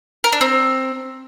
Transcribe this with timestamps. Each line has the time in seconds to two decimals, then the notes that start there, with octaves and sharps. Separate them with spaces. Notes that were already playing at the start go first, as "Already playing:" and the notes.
0.24 A#4
0.32 D4
0.41 C4